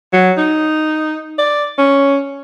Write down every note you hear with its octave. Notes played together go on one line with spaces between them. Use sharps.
F#3
D#4
D5
C#4